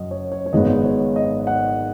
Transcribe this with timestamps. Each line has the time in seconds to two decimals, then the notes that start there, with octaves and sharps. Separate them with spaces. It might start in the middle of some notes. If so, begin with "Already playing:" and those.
Already playing: F#1 F#2 F#3 D#5
0.11 C#5
0.32 C#5
0.46 C#5
0.53 G#1 G#2 G#3 B3 D#5
0.84 C#5
1.16 D#5
1.47 F#5